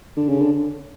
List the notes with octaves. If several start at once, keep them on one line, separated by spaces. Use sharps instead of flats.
D3
C#3
D3